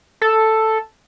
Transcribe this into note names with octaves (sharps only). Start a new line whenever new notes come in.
A4